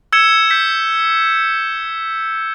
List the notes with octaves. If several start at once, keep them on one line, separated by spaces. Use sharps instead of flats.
E6 G#6 C#7 E7 G7
G6 B6